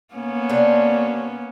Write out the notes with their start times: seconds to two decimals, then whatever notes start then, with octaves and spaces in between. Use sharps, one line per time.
0.15 A#3 B3 C#4
0.49 C3 D4